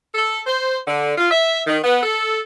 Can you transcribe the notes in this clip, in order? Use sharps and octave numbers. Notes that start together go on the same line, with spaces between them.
A4
C5
D3
F4
E5
D#3
B3
A4